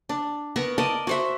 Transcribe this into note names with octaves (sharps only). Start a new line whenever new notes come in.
D4
B3 A#4 A#5 C#6
A#4 D5 D#5 A5
F#4 C5 E5